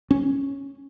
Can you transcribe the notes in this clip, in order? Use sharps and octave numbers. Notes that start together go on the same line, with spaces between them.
C#4